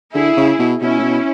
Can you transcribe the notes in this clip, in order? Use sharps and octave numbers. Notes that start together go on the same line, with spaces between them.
D3 E4 G#4
C#3
B2
B2 C#4 E4
A2
B2